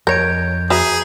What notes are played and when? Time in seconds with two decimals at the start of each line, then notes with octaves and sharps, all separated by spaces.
0.07 F2 A#4 C#5 D#5 G6 G#6 D7
0.70 F#4 G#4 B4 E5 A#5